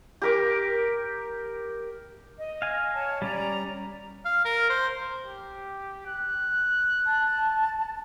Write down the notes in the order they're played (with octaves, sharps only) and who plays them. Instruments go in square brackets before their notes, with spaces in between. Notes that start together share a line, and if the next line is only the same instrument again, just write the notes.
[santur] G4 A#4 D6
[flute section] D#5
[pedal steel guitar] F5 G#5
[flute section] C#5 A5
[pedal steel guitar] G3 C#4 [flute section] D5 A#5
[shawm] F5
A#4
C5
[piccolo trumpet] G4
F#6
[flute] A5